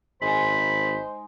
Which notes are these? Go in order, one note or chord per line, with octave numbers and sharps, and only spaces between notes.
G#1 G#3 D#4 C5 B5